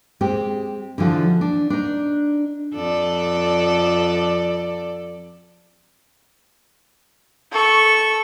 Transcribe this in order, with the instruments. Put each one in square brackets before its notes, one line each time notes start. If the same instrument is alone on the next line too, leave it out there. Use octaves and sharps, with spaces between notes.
[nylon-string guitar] G#3 C4 G4
D3 E3 F3 F#4
D4
D4 D#4
[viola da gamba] F2 A4 D5
[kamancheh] A4 C#6